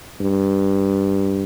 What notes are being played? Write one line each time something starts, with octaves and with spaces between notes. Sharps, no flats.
G2